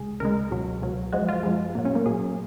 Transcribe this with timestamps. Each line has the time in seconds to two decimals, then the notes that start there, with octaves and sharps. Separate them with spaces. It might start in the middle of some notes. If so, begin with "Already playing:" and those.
Already playing: C#2 C#3 G#3 G#4
0.20 C#2 C#3 G#3 A#4
0.51 C#2 B2 F#3
0.82 C#2 B2 F#3
1.12 F#2 F3 G#3 F#4
1.29 F4
1.43 F#2 F3 G#3
1.75 A#2 F#3 A#3
1.85 C#4
1.95 A#3
2.06 A#2 F#3 G#4